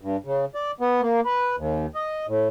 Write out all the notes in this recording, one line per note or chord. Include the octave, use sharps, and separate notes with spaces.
G2
C#3
D5
B3
A#3
B4
D#2
D#5
A2